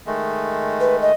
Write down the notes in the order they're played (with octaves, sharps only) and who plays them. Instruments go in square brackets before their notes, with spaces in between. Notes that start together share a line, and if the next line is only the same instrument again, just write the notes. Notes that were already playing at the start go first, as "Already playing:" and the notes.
[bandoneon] D#3 G#3 A3
[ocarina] B4
D#5